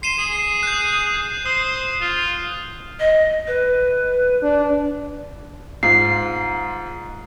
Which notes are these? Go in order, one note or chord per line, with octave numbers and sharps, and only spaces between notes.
C6 C7 D#7 E7
G#4
F#6 G6
C5 D#6
F4
D#5
B4
D4
G#2 F4 C7